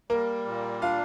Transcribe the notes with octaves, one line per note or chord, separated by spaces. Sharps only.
G3 A#3 A#4
A#2
D4 F4 F5